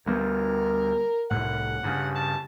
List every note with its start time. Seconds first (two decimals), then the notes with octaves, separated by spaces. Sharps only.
0.06 D2 G3 B3 A#4
1.31 C2 A2 F#5
1.83 G2 C#3
2.16 A5